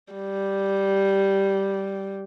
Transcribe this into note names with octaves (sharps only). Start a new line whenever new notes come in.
G3